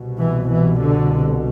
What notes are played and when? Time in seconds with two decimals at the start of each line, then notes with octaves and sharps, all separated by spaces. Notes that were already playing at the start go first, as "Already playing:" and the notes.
Already playing: C2 B2
0.20 E3
0.50 E3
0.81 D3